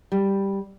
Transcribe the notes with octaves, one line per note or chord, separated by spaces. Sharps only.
G3